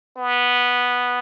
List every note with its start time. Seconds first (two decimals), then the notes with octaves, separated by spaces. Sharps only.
0.17 B3